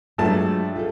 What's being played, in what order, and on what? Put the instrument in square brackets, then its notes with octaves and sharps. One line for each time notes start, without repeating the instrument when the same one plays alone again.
[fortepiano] G2 A3 A5 [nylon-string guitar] F#3 G#3 F4
[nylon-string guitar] F4 G#4 A4